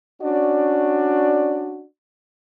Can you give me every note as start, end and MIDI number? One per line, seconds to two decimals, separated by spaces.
0.22 1.84 61
0.22 1.84 62
0.22 1.84 66
0.22 1.84 74